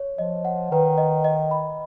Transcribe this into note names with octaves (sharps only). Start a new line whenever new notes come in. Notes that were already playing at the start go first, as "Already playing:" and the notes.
Already playing: C#5
F3 D#5
F#5
D#3 B4
D#5
D#5
B5